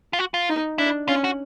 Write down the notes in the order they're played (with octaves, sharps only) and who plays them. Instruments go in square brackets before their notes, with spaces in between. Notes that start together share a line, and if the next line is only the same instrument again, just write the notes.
[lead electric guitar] F4
F#4
F4
[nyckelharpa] D#4
[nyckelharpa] D4 [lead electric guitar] E4
[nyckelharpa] C#4 [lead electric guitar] F4
[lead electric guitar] F#4